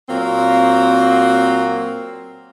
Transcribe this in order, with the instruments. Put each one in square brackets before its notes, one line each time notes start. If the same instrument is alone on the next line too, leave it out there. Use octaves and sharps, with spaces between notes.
[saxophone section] A#2 F#3 A#3 C4